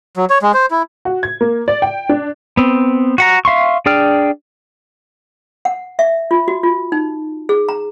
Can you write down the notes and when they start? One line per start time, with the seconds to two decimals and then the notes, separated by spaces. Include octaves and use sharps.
0.17 F#3
0.30 C#5
0.42 G#3
0.54 C5
0.71 E4
1.05 F#4
1.23 G#6
1.41 A#3
1.68 D5
1.82 G5
2.09 D4
2.57 B3 C4
3.18 F#4 F#5 A#5
3.45 E5 F5 C6 C#6
3.86 D4 G#4 D5 G5 F6
5.65 F#5
5.99 E5
6.31 F4
6.48 F#4
6.63 F4
6.92 D#4
7.49 G#4
7.69 A#5